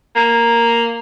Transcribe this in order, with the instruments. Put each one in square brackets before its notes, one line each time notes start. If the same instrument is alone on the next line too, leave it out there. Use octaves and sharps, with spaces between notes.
[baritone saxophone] A#3